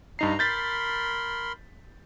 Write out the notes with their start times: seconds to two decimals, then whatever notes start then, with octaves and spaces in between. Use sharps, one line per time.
0.19 G2 D#4 A#5 C7
0.39 A#4 B5 C6 G6 A6 B6